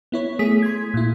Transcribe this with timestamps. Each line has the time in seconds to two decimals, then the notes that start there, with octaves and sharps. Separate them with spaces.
0.12 B3 E4 C#5
0.39 A3 G#4 D#6 B6
0.63 C6 G#6
0.94 A#2 E4